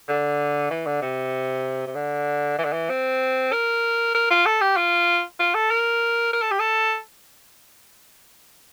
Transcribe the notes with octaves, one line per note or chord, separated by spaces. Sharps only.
D3
E3
D3
C3
C3
D3
E3
D3
E3
C4
A#4
A#4
F4
A4
G4
F4
F4
A4
A#4
A#4
A4
G4
A4